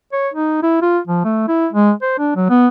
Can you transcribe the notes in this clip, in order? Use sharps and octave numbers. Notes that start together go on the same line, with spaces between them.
C#5
D#4
E4
F4
F3
A3
E4
G#3
C5
D4
F#3
B3